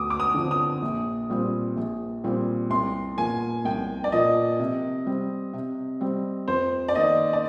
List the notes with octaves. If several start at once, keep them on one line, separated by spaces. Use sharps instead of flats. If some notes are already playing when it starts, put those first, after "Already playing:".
Already playing: D2 D6 D#6
D6
D#6
D3 F3 C4
D#6
A#1
A#2 G3 C4
A#1
A#2 G3 C4
C2 C6
A#2 F3 A#3 G#5
C2 G5
D5
A#2 F3 A#3 D#5
C3
G3 C4
C3
G3 C4
F2 C5
D5
D#3 A#3 D#5
D5